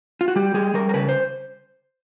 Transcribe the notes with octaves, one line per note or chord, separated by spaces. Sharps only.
F4
F#4
G3 G4
G3 G#4
G3 A#4
A#4
C#3 B4
C5